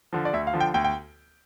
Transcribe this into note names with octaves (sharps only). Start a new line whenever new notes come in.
D3 F3
D5
D2 E5
F5
D3 F3
G5
D2 G5
G5